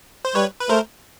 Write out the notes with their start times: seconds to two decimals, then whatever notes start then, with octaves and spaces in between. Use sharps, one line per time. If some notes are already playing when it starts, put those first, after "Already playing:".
0.25 C5
0.35 G3 B4 C#5
0.60 B4
0.69 A3 A#4 C5